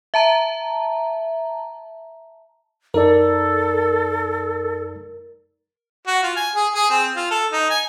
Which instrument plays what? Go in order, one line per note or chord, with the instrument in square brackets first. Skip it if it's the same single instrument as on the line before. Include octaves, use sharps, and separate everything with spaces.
[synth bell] E5 A5 A#5
[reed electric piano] F#2 D#4 D5 [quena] A4 [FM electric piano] A#4
[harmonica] F#4
F4
G#5
G#4
G#4
C4
F4
A4
D#4
G#5